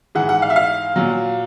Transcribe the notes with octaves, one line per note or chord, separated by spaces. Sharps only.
G#2 E3 F#5
F#5
F5
E5
F5
A#2 F#3